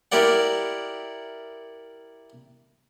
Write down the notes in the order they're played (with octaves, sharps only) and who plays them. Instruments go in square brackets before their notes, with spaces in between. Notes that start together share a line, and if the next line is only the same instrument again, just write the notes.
[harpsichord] E4 G4 A#4 D5 F#5